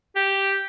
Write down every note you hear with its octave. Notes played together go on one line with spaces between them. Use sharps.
G4